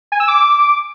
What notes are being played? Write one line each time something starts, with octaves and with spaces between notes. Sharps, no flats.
G#5
E6
D6